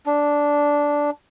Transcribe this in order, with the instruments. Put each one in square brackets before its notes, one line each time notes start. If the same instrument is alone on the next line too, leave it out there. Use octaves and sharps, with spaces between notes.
[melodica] D4